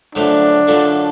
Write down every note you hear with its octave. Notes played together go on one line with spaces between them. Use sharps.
F#2 D3 F3 A3 D4
F#2 D3 F3 A3